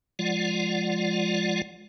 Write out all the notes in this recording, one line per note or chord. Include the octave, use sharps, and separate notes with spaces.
F3 G#3 F4 D5 F#5